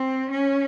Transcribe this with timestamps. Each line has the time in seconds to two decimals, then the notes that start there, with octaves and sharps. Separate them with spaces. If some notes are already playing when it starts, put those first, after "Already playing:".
Already playing: C4
0.32 C#4